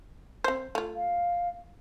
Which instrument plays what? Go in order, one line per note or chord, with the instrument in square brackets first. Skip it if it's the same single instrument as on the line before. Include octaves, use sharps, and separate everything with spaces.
[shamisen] C4 C5
A3 F4
[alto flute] F5